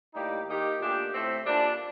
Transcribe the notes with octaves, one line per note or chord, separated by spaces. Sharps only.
A2 G3 A#3 D#4 G4
D#3 A#3 D#4 G4
A#2 A3 D4 G4
A2 A3 C4
A#2 G3 D4